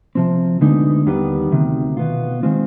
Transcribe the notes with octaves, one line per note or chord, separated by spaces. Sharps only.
C3 F3 C4
D2 D3 G#3 B3 D#4
D#2 D#3 G3 B3
D2 C3 D#3
B2 B3 F4
D#3 G#3 C4 F4